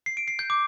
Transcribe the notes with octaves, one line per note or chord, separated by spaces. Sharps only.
C7
D7
C7
G6
D6